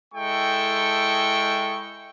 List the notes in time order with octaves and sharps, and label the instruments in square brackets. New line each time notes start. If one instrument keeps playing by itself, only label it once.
[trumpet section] G#3 E4 A4 G5 C#6